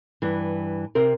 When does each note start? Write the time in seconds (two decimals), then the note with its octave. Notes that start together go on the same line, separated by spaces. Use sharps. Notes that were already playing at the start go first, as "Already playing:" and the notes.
0.22 G2 E3
0.95 C3 C4 A#4